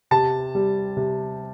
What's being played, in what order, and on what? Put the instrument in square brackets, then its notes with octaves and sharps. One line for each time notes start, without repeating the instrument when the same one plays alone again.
[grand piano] C3 A5
G3
C3